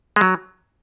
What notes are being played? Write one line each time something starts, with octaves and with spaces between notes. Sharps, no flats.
G#3
F#3